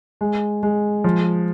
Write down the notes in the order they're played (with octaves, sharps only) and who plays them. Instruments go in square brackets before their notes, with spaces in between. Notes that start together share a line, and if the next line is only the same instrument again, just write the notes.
[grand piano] G#3
G#3
F3